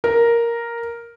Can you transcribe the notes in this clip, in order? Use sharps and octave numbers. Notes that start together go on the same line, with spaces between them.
A#4